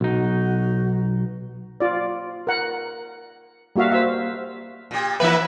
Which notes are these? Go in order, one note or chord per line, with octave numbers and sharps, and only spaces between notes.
B1 D#4 F#4
F4 D5
A#4 F#5
G3 A#3 F#4 E5 F5
C5 E5
A#2 G4
E3 A#3 E4 B4 E5